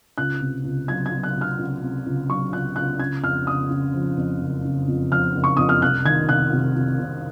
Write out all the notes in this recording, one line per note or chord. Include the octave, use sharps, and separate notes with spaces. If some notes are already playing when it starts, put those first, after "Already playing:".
C#2 F#6
C3
C#2
F#3 G#6
G#6
F#3
F#6
C3
F6
C#2
C3
C#2
F#3 C#6
C#2 F#6
C#2 F#6
C#3 G#6
F2 F6
C#3 D#6
C#3
F3
F2
F#1
C#3
F2
F3 F6
F#1
C#6
F2 D#6
F6
C2 F#6
D#3 G#6
C2 F#6
C3
C3
C3